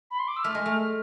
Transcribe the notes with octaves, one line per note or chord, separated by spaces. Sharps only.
B5
C6
D6
E6
A3 F6
G#3
A3